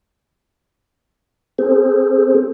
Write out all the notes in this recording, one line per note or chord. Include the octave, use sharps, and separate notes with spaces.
C4 G#4 A4 C5